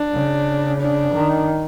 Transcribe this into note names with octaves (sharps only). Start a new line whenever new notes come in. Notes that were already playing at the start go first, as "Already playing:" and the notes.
Already playing: D4
C#3
D4
D#3